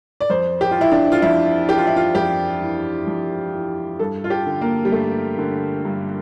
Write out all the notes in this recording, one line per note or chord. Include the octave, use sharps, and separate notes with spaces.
D5
F2 C5
G4
E3 F4
E4
D4
F4
F2 E4
E3 G4
F4
E4
F4
F2 G4
E3
F2
E3
G2 A4
F4
G4
D3
A#3
G3
G2 A3
D3
G2